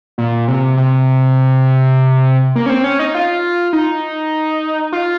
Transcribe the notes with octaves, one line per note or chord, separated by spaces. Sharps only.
A#2
C3
C3
A#3
C#4
C4
C#4
D#4
F4
D#4
F4